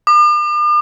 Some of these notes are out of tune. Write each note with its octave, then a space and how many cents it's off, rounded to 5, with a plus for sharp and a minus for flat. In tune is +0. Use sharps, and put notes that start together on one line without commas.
D6 +45